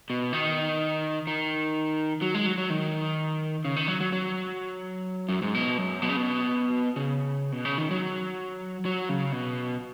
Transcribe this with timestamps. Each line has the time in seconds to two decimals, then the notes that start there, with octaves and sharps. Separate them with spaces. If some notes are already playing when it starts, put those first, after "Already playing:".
0.10 B2
0.33 D#3
1.27 D#3
2.22 F#3
2.34 G#3
2.46 F#3
2.58 F#3
2.70 D#3
3.65 C#3
3.76 D#3
3.87 F#3
4.00 F#3
4.12 F#3
5.29 F#2
5.42 G#2
5.55 B2
5.78 F#2
6.02 B2
6.09 C#3
6.17 B2
6.96 C#3
7.52 B2
7.65 C#3
7.78 D#3
7.91 F#3
8.85 F#3
9.09 C#3
9.32 B2